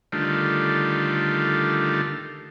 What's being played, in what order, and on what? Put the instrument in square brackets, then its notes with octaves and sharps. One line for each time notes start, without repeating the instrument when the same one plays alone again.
[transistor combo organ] D3 D#3 G3 A3 F4